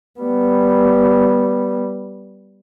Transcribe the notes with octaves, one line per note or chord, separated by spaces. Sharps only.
G3 B3